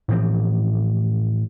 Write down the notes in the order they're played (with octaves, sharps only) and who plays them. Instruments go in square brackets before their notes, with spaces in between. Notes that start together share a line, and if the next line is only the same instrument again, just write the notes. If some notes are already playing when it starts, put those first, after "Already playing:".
[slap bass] A2 E3 F3 C4